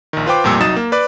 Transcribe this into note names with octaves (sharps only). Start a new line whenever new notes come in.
A#1 D#3
F4 B4 C5 G5 D6
A1 F2 A#2 G3 E6
C2 F#3 D#4 D#6 A6 E7
A#3
B4 D5 D6